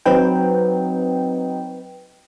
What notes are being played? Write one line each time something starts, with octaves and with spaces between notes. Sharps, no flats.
F#3 C4 D#4 B4 G5